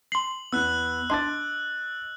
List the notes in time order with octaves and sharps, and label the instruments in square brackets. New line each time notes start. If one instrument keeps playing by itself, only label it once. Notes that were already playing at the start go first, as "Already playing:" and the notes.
[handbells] C6 C7 [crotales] F#7
[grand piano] E2 B3 [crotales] E6 F#6
[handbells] D4 C6 [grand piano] D#5 D6 A6